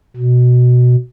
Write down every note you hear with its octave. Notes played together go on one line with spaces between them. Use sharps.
B2